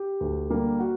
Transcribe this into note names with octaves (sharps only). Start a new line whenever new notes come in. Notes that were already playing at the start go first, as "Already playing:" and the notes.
Already playing: G4
D2
D3 G3 A#3
F#4